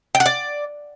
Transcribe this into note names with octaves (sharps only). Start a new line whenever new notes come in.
G5
F#5
D5